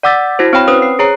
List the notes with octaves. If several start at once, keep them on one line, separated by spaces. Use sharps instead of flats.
D5 F#5 D6 E6 A6 B6
E4 F#4 C5
C4 C#5 G5 B5
C#4 B4 C5 D#6
C7
G#4 C#5 A#5 C7